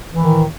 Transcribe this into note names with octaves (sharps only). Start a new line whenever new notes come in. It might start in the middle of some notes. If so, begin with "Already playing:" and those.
A2 D#3 E3